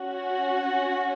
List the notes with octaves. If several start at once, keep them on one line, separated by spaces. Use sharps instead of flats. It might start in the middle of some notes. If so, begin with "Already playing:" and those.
Already playing: C#4 F#4